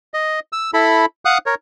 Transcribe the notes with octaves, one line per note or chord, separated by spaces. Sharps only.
D#5
E6
E4 A4 B5
F5 F#5 D#6 F#6
A#4 C#5